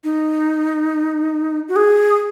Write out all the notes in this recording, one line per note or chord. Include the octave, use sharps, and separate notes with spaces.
D#4
F#4
G#4